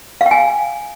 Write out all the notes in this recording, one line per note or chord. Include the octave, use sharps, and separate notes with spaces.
F5
G5
G#5